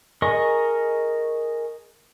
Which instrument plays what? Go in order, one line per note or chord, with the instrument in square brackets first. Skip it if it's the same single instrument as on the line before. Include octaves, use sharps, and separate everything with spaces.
[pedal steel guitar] G#4 A#4 D#5 C#6